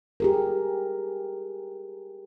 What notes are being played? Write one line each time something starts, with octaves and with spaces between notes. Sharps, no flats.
G4 G#4 A#4